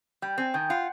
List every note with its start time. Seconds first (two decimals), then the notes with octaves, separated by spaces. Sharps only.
0.22 G3 G5
0.38 C4 G#5
0.54 D#3 G5
0.69 F4 F#5